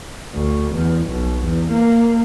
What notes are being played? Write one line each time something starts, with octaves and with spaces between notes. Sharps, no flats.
D2
E2
B1
E2
A#3